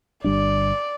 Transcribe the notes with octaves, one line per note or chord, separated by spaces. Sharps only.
G1 G3 D4 D5